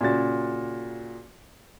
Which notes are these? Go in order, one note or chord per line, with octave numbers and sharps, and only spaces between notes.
A#2 C#3 F#4 A6